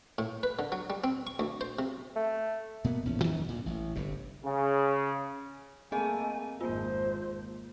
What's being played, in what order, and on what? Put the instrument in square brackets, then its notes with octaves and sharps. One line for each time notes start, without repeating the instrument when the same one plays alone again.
[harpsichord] A2
B4
D3
F#3
G3
C4
C#6
D2
C5
C3
[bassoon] A3
[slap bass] B2 A#3 B3
A#1 E2 G#2 C#4
E2 D#3 F3 C#4
D2 A#2
A1
G1 G2 C3
[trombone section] C#3
[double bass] A3 A#3 [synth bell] C4 G#4 D#5 [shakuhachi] G#5
[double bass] G#1 F2 [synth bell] A#3 F4 [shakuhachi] C5